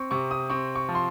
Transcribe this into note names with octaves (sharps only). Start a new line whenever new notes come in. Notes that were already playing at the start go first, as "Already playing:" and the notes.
Already playing: C4 C#6
C3 C#6
D#6
C4 C#6
C#6
F3
C6